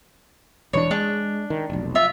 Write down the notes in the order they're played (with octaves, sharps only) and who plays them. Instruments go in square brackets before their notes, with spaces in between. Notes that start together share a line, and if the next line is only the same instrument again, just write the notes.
[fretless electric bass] E1 E3 D4 [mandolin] C#5
[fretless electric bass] G#3 [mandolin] D4
[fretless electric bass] D#3
F1 B1
[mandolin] F4 E5